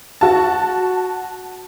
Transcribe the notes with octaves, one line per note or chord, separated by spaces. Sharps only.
F#4 A5